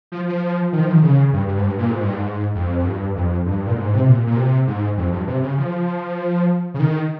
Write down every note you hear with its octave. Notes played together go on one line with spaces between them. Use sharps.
F3
F3
D#3
F3
D#3
C#3
G2
G2
G#2
G2
A#2
G#2
G2
G#2
F2
F2
G2
F2
G2
A#2
G#2
C3
A#2
A#2
C3
G#2
F2
G2
C3
C#3
F3
C#3
D#3